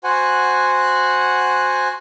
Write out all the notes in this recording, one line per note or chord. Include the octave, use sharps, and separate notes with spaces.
F#4 C5 F#5 G#5